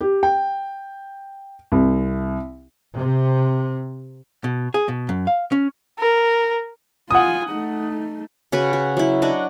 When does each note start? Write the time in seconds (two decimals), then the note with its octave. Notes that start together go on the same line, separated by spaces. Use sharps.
0.01 G4
0.23 G5
1.72 C2
2.95 C3
4.44 B2
4.74 G#4
4.88 B2
5.09 F#2
5.27 F5
5.52 C#4
5.99 A#4
7.11 F4 F#5 G#5 D#6
7.50 A3 D#4
8.52 C#3 F#4 B4
8.73 F#4
8.97 F#3 E4
9.22 D4 F#4 D#5 D6